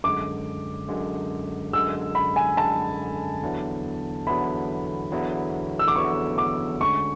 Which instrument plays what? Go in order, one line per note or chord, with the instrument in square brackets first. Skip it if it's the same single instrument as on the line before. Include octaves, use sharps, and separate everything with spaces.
[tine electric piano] F#2 D3 G#3 [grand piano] D6
[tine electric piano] F#2 D3 G#3
[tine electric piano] F#2 D3 G#3 [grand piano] E6
[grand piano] B5
G#5
[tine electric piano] F#2 D3 G#3 [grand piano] A5
[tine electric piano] E2 D3 F#3 B3 E4
[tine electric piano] E2 D3 F#3 B3 E4 [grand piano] B5
[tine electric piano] E2 D3 F#3 B3 E4
[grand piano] E6
D6
[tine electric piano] E2 D3 F#3 B3 E4 [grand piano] C#6
[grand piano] D6
[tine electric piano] D2 D3 G#3 C#4 [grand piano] C#6